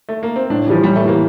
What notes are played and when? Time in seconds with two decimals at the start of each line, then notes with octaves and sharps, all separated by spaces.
0.09 A3
0.23 A#3
0.36 C4
0.50 A2 D4
0.67 E3 F3 G3
0.83 A2 G3
0.96 A3
1.03 E3 G3 A#3